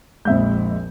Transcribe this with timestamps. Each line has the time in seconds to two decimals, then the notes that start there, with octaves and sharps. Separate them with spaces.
0.25 A#1 F2 G#3 E5 G6